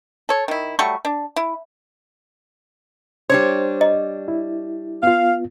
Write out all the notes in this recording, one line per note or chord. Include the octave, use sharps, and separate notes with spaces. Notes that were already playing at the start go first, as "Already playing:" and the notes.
A4 C#5
D#3 E4
F#3 G3 A3 C#6
D4
E4
G3 D4 C5 C#5
D#5
E4
B3 F4 F5